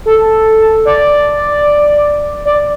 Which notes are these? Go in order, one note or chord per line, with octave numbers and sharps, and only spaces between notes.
A4
D5
D5